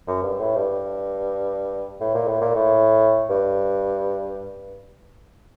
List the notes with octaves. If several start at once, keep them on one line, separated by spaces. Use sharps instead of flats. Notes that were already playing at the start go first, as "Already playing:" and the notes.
F#2
G2
A2
G2
A2
A#2
A2
A#2
A2
G2